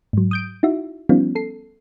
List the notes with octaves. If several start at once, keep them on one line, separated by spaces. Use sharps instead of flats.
G#2 F#3
D#6 G6 D7
D#4 E4 F#4 E5
F3 G3 B3 C#4 D#4 F4
A4 C7